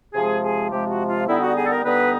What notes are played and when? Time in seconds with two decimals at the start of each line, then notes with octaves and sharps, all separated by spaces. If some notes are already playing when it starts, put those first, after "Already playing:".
0.14 C3 F3 G#3 G#4
0.43 G#4
0.70 C3 F3 G#3 G4
0.90 F#4
1.08 F4
1.27 D3 G3 B3 D#4 E4
1.41 F#4
1.56 G#4
1.66 A4
1.70 A#4
1.84 D3 G3 B3 D#4 B4